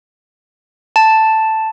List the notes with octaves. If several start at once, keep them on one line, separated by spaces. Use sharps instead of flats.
A5